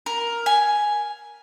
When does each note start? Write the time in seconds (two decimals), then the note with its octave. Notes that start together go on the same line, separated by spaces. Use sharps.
0.06 A#4
0.46 G#5